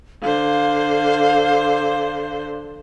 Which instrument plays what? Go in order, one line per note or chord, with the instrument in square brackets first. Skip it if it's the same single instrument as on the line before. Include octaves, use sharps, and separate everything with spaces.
[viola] D3 C5 [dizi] F5